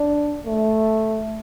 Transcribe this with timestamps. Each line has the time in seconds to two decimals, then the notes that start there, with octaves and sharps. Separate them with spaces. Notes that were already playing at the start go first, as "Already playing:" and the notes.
Already playing: D4
0.46 A3